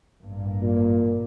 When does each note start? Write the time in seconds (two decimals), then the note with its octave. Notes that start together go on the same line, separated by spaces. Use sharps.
0.21 A1 G2 A#3
0.62 A#2